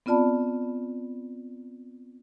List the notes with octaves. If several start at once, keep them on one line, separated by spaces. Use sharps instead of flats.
B3 C4 F4 D5 A5 B5